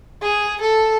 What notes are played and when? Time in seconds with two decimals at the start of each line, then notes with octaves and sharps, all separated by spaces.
0.22 G#4
0.61 A4